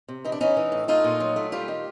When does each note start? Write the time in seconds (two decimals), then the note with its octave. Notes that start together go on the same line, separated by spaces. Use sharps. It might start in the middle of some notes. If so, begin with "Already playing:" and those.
0.08 C3
0.25 E3 D#4
0.32 D4
0.40 E3 C#4 D#4
0.57 E3
0.72 A2
0.88 A3 D#4 F4
1.04 A#2
1.20 F#3
1.36 A3
1.52 G3 F4 G4
1.68 D#3